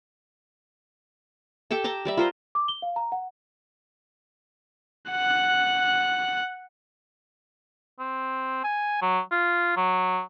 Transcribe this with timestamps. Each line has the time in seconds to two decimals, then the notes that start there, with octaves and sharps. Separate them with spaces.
1.71 G4 A4 G5 A5
1.84 G5 A5 A#5 D6
2.05 G3 D5 E5
2.17 F4 A#4 C5
2.55 D6
2.68 G7
2.82 F5
2.96 A#5
3.12 F#5
5.11 F#5 F#6
7.99 C4
8.64 G#5
9.02 F#3
9.32 F4
9.77 F#3